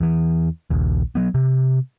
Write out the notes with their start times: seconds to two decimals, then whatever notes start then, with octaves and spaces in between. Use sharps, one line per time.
0.01 E2 E3
0.70 A#1 D#2
1.15 F#3 B3
1.34 C3